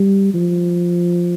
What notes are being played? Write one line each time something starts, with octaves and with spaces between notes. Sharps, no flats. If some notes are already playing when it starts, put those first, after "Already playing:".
Already playing: G3
F3